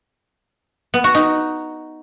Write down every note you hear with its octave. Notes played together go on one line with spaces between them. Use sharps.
B3
F#4
D#4